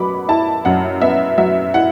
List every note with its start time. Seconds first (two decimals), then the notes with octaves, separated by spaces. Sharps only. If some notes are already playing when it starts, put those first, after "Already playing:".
Already playing: F#2 F#3 B3 B5 D6
0.29 E4 A5
0.65 F#2 F#5
1.02 B3 E5
1.38 F#3 E5
1.74 E4 F#5